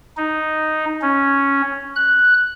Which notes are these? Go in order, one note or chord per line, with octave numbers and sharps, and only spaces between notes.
D#4
C#4
F#6